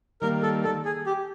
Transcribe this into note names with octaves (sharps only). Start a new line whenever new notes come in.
D#3 G3 A#3 A#4
A4
A4
G#4
G4